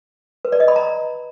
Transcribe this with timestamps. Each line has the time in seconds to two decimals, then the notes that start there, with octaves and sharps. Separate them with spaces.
0.45 B4
0.52 D5
0.60 D#5
0.68 B5
0.76 A#5